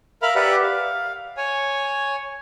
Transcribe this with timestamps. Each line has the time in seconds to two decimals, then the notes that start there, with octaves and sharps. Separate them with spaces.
0.22 A#4 E5 F5 B5 F6
0.35 G4 B4 D5 E5 F#5
0.63 F5
1.37 C#5 G#5